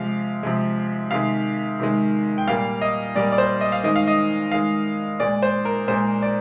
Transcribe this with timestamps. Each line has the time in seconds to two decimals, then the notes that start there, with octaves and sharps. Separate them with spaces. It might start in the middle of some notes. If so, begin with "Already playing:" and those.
Already playing: C3 F3 G#3 F5
0.43 C3 F3 G#3
1.11 C3 D#3 G#3 F5
1.80 C3 D#3 G#3
2.38 G5
2.47 A#2 G3 A#3 F5
2.81 D#5
3.15 A#2 G3 A#3 D5
3.32 D5
3.38 C5
3.61 D#5
3.72 F5
3.84 D#3 G#3 D#5
3.96 F5
4.08 D#5
4.52 D#3 G#3 F5
5.20 A#2 G#3 D5
5.43 C5
5.65 A#4
5.88 A#2 G#3 C5
6.22 D5